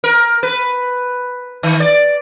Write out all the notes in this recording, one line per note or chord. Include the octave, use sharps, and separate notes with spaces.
A#4
B4
D#3
D5